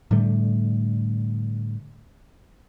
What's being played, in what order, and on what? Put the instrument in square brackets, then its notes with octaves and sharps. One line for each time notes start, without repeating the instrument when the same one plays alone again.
[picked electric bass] A2 D3 G3 A3